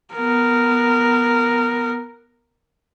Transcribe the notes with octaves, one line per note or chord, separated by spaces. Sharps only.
B3 A#4